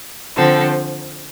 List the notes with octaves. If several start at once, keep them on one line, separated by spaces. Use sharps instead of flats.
D3 F3 C4 A4